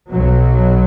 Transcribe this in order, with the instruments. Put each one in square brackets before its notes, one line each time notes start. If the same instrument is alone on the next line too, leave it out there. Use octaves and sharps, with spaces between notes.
[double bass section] B1 B2 F#3